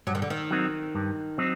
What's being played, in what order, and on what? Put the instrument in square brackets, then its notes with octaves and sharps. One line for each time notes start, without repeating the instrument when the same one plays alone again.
[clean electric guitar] G2 [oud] F#3
[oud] D#3
D3
D#3
[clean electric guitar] F#3 C4 D#4
G2
F#3 C4 D#4